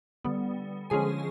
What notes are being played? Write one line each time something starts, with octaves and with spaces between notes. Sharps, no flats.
D3 G3 B3
D3 F3 G#3 C#4 G#4 G#5